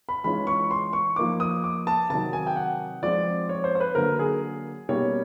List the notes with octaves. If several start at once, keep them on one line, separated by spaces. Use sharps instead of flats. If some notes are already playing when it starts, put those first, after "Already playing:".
B5
E3 G#3 C#4 F4 B5
C#6
C6
C#6
F3 A#3 D#4 D6
D#6
D6
A5
C3 D#3 F#3 A5
G#5
G5
F#5
F3 G#3 C4 D5
C#5
C5
C5
B4
D3 F#3 A#3 A#4
G#4
B2 G3 A#3 C#4 C#5